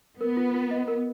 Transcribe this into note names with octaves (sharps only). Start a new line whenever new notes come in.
B3 A#4
F4
F4
D#5
A#4